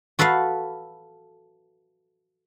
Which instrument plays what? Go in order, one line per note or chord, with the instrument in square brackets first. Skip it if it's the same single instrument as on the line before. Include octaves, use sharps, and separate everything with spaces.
[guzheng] F#4 A4 B4 E5 F5